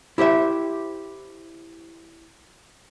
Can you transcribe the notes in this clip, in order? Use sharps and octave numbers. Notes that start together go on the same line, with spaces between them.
E4 G4 C5 E5